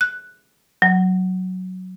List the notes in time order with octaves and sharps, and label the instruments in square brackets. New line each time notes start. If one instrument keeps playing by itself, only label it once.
[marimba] F#6
F#3